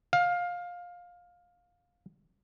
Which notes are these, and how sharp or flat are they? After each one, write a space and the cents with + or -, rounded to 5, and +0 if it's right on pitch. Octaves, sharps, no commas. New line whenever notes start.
F5 +20